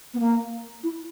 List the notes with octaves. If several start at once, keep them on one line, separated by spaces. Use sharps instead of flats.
B3
A#3
E4